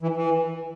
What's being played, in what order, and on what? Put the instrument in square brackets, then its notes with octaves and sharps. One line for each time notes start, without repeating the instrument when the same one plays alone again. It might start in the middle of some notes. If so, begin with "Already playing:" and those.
[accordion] E3
E3